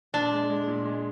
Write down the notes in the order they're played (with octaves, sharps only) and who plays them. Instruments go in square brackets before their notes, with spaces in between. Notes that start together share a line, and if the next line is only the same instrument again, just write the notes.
[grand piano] A#2 [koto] D4
[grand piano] G#3
G#3
A#2
G#3